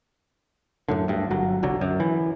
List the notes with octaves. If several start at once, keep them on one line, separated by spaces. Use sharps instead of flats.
F#2 A2 D3
D2 G2
G1 F#3
G1 C2 D3 F#3
F#2
E3